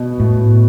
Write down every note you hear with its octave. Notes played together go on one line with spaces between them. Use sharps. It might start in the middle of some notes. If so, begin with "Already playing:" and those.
Already playing: B2 B3
A2